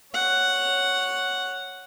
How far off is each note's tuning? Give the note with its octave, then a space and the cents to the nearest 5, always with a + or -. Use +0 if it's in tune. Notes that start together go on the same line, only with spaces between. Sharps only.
C#5 +0 F#5 +0